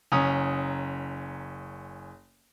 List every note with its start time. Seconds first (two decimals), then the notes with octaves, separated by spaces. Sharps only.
0.12 F#1 C#4 A#5 D#6